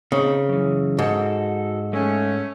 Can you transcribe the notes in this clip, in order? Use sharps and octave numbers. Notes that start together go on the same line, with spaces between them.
C#3 C4 D#4
F#2 E3
G#2 F#4 A4
G#3 A3 C#4